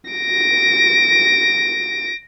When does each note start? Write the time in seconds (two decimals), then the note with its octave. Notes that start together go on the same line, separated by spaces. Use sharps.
0.11 A#6 D7